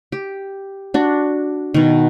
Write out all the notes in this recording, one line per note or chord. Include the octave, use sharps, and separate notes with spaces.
G4
D4 F#4
B2 D#3